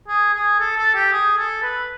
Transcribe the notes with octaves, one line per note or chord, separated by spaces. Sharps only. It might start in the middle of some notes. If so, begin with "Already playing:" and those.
G#4
G#4
A4
A4
G4
G#4
A4
B4